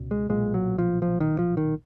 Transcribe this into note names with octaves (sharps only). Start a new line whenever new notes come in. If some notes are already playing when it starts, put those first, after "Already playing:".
Already playing: C#2 B2
G#3
B1 A#2 G#3
F#3
F3
F3
D#3
F3
D#3